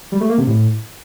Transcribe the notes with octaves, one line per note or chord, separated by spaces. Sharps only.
G3
A3
A#3
C3
A2